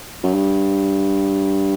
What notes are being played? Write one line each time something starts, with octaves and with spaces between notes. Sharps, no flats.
F#2
G2